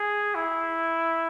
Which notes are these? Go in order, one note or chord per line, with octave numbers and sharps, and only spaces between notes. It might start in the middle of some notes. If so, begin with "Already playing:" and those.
Already playing: G#4
E4